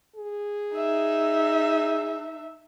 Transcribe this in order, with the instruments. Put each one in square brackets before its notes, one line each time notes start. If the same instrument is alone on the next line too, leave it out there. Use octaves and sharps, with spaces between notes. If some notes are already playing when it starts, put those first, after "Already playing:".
[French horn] G#4
[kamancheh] D#4 E5